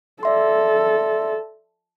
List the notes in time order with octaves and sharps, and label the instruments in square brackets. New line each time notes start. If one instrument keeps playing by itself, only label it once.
[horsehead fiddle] A4 [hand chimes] D5 E5 C6